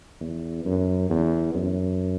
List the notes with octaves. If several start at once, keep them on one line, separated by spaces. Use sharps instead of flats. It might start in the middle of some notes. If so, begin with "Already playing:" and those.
E2
F#2
E2
F#2